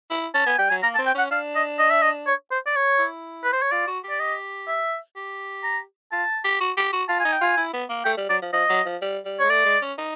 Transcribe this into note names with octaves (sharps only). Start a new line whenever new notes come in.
E4
C#4 A5
B3 G#5
G3 G5
F#3 G#5
A#3 A#5
A5
C4
G5
C#4 F#5
D4 F5
D#5
D#5
E5
D#5
C#5
C5
D5
C#5
E4
B4
C5
C#5
F4 D5
F#4
G4
D5
D#5
E5
G4
A#5
F4 A5
G4
F#4
G4
F#4
F4 A5
G#5
D#4
G5
F4 G#5
E4
B3
A#3
A3 G5
G3
F#3 D5
F3
F3 D#5
F#3
F3
G3
G3
C#5
G#3
A3 D5
G#3
C#4
D#4